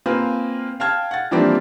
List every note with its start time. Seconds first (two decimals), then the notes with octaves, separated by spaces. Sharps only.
0.06 A#3 C4 F4 B4 G#5
0.80 F5 G5 A5 F6 G#6
1.11 F#5 A6
1.31 E3 F3 G3 A#3 C4 D4